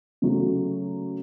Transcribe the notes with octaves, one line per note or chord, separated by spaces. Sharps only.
C#3 F#3 A3